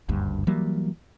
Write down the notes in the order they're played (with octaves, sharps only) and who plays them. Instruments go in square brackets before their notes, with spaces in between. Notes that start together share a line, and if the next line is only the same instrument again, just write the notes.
[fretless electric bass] F#1 D2 G2
E3 F#3 G3 A#3